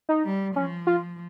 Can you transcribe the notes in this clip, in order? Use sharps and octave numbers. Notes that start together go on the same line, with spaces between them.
D#4
G3
F3 C#4
F4